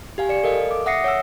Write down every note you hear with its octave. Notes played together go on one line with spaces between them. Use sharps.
G4 F5 G#5
D5 C#7
A4 A#4 D#5 F5
D6
E5 F#5 D#6 A#6 C7 C#7
C#5 F#5 E6